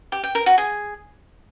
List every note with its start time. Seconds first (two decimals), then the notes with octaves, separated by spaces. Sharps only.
0.12 G4
0.24 G5
0.35 A#4
0.46 F#4
0.58 G#4